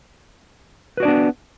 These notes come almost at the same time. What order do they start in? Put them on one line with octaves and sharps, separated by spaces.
B4 F#4 D5 D4 B3